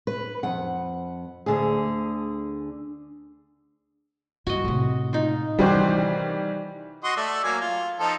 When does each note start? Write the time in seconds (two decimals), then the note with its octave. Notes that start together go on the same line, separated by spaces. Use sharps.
0.07 B4
0.43 F2 F#5
1.46 D2 D3 G#4
4.47 G2 F#4 D#5
4.65 A2 C3
5.13 D#4 F4
5.59 C3 D#3 E3 G3 F#4 G4 C5
7.04 F#4 D#5 C6
7.17 A3 D5 E5
7.44 F#3 A#3 G#5
7.61 F4
8.00 F3 D#4 A4